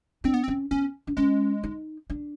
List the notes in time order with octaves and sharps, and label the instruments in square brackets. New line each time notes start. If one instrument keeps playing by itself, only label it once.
[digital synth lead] C4 [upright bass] D4
[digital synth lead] B3
C4
[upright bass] C#4
[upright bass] B3 [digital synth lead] C#4
[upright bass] D4
[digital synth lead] G#3 [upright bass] C#4
[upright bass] D#4
D4